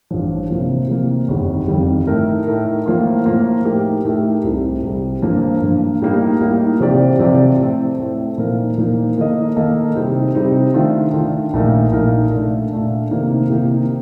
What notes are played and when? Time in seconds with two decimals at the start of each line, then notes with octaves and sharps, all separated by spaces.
0.11 A1 G2 F3
0.50 C3 F3 A#3 F4
0.89 C3 F3 A#3 F4
1.28 G1 F2 D#3 G3
1.68 G1 F2 D#3 G3
2.07 A2 A3 D#4 A#4
2.47 A2 A3 D#4 A#4
2.86 A2 F3 A#3 F4
3.25 A2 F3 A#3 F4
3.65 A2 A3 D#4 G4 A#4
4.04 A2 A3 D#4 G4 A#4
4.44 C2 C3 G3
4.83 C2 C3 G3
5.22 G2 F3 A#3
5.62 G2 F3 A#3
6.01 A2 G3 A#3 D#4
6.41 A2 G3 A#3 D#4
6.80 C3 F3 C4 G4 D5
7.19 C3 F3 C4 G4 D5
7.59 A2 A3 C4
7.98 A2 A3 C4
8.38 A#2 F3 A#3 D#4 A#4
8.77 A#2 F3 A#3 D#4 A#4
9.17 D#3 A#3 D#4 A4 D#5
9.56 D#3 A#3 D#4 A4 D#5
9.95 C3 G3 C4 D#4
10.34 C3 G3 C4 D#4
10.74 D#3 A3 D4 F4
11.14 D#3 A3 D4 F4
11.53 A#1 A#2 A3 D#4 A#4
11.92 A#1 A#2 A3 D#4 A#4
12.32 A#2 A3 D4
12.71 A#2 A3 D4
13.11 C3 D#3 A#3 D#4
13.50 C3 D#3 A#3 D#4